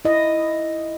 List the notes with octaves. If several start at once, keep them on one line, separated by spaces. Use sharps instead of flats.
E4 D#5